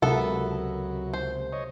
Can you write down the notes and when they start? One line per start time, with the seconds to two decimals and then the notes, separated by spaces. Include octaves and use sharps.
0.02 C#2 C3 F#3 B3 A4 A#4 E5 F#5
1.14 C5
1.52 C#5 D#5